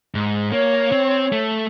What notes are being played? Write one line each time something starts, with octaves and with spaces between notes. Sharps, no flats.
G#2
A#3 C#5
C4
A3